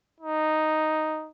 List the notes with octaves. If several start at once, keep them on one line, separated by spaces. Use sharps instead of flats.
D#4